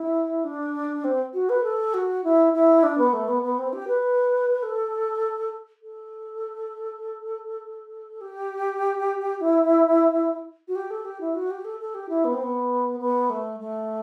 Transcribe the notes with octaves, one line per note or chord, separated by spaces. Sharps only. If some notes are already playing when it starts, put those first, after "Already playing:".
Already playing: E4
D4
C4
F#4
B4
A4
F#4
E4
E4
D4
B3
A3
B3
B3
C4
G4
B4
A4
A4
G4
E4
F#4
G4
A4
G4
E4
F#4
G4
A4
A4
G4
E4
B3
C4
B3
B3
A3
A3